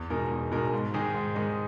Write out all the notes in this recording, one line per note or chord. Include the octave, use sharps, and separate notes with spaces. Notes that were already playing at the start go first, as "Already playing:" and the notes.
Already playing: E2
B2 G#3 D#4 A#4
E2
B2 G#3 D#4 A#4
G#2
D#3 G#3 D#4 G#4
G#2
D#3 G#3 D#4 G#4